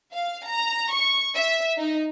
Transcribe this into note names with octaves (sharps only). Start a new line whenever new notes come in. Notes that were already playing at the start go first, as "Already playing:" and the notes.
F5
A#5
C#6
E5
D#4